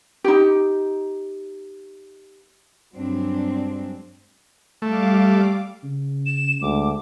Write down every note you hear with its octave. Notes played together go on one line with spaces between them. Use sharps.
D#4 G4
G2 F#3 G#3 C4 D4
G3 A3 F5 D6
C#3
E7
D2 G#3 D6